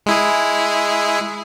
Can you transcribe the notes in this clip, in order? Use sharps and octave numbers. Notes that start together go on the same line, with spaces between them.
G#3 E4 G#4